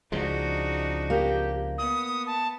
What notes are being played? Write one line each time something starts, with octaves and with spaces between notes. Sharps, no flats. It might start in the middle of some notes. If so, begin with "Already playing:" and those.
C#2 F3 G#3 D4 D#4 F#4
A#3 G4
B3 D#6
A5